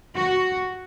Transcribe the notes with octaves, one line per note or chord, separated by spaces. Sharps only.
F#4